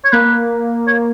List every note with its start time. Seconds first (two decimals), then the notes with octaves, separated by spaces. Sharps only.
0.04 C#5
0.13 A#3 B4
0.87 C#5